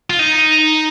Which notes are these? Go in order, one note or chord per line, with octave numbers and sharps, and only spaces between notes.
F4
D#4